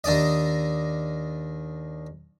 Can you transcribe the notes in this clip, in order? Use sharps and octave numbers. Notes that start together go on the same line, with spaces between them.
D#2 D4 D5 D#5